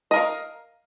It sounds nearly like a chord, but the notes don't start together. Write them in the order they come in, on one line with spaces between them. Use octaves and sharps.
D#5 A#4 F5